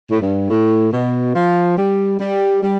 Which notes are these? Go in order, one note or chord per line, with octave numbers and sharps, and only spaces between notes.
A2
G2
A2
B2
F3
G3
G3
G3